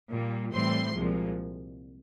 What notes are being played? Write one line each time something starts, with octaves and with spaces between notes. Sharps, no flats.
A#2 G3 A#3
A2 E3 G3 C4 C6
C2 A#2 F3 G#3